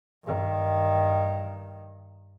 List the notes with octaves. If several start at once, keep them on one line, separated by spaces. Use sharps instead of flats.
G2 D#3